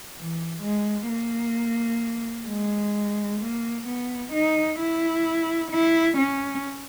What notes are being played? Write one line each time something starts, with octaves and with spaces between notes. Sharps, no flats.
E3
G#3
A#3
G#3
A#3
B3
D#4
E4
E4
C#4